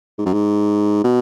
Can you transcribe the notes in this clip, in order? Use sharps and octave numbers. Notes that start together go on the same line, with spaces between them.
G#2
F#2
G#2
B2